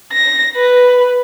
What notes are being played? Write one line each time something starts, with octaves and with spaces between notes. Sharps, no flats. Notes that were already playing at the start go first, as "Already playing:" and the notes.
A#6
B4